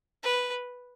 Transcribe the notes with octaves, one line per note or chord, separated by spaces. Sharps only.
B4